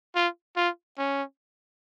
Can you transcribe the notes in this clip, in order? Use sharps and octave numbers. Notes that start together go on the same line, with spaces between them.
F4
F4
C#4